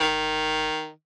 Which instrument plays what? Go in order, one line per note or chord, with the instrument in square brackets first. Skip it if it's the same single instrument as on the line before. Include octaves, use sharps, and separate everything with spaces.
[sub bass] G1 [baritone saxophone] D#3